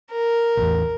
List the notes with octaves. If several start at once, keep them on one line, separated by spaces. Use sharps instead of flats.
A#4
A1 E2